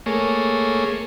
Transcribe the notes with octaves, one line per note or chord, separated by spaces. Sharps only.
A3 A#3 G#4 C#5